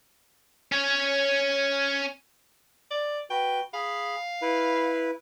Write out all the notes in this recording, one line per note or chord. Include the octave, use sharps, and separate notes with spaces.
C#4 C#5
D5
F#4 B4 G5
G#4 F5 B5
E4 B4